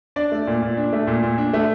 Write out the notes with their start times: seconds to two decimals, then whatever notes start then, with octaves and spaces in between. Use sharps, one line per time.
0.16 D4 D5
0.32 A3
0.47 A#2
0.62 A#2
0.77 D4
0.93 A3
1.07 A#2
1.22 A#2
1.38 D4
1.53 A3